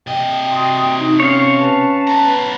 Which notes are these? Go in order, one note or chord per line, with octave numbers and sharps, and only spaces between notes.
C3 D#5 G5
F#4 C6 D#6
D#4
C#4 C#5 F5
B4 A5
B3 A#5